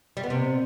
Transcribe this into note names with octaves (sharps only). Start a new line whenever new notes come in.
G3
B3
C3